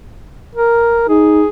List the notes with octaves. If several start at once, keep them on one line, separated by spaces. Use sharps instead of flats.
A#4
D#4 G#4